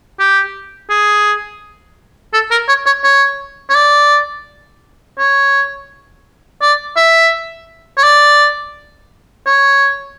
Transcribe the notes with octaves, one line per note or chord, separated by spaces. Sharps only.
G4
G#4
A4
A#4
C#5
C#5
C#5
C#5
D5
C#5
D5
E5
C#5
D5
C#5